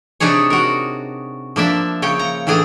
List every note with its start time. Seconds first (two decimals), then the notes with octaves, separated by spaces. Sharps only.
0.20 C3 D4 D#4 G#4 C#5
0.50 F#4 A#4
1.56 F3 A#3 D4 E5
2.02 C#3 C#5 G5
2.19 A#5
2.47 A2 E3 D4 G#4 G#5 A#5